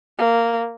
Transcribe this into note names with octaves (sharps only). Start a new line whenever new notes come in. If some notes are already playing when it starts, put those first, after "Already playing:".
A#3